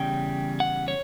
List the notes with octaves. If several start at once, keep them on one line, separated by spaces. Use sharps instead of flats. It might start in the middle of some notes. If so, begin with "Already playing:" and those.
Already playing: E2 C#3 G3 G5
F#5
C#5